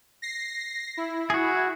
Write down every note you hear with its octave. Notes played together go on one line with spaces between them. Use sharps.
A#6 C7
E4
F#4 G#4